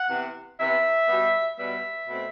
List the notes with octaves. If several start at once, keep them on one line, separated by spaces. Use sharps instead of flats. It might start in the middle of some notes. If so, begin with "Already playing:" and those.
Already playing: F#5
C3 E3 B3
C3 E3 B3 E5
B2 G3 B3
B2 G3 B3 E5
B2 A3 C4